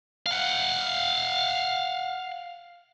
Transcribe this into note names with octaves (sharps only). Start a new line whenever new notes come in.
F5 F#5